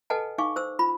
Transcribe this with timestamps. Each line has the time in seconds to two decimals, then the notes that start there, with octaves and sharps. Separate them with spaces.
0.10 A4 B4 D#5 F#5 G#5 A5
0.38 D#4 F5 G#5 C#6 D6
0.56 C5 E6
0.79 F4 B5